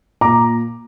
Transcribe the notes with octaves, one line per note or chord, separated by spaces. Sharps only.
A#2 A#5 D6